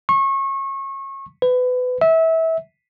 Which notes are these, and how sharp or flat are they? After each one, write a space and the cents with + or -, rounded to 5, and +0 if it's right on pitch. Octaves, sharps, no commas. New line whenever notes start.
C#6 -30
B4 +25
E5 -25